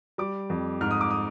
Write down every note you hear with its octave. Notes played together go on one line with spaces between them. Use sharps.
G3 D6
F2
G#2 F6
D#6
D6
D#6